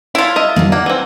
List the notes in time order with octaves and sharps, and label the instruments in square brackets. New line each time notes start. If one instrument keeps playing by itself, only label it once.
[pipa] E4 F4
[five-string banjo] D#5 E5
[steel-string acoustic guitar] D3 F#3 A#3
[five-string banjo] A#3 [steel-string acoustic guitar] F#5
[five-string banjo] E3 C4